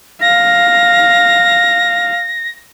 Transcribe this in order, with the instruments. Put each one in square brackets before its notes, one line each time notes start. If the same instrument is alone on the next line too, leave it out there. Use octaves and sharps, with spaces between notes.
[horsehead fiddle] F5 [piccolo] A#6